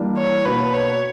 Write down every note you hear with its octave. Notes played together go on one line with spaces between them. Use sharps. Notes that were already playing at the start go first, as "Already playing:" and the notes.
Already playing: E3 G3 A#3 D4
C#5
B2 A#3 D4 F#4 B4
C#5